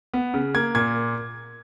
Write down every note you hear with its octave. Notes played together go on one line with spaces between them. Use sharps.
B3
C#3
A#3 G#6
A#2 G#6